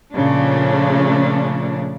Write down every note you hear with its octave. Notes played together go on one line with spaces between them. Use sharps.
A#2 C#3 F3 A3 C#4 D4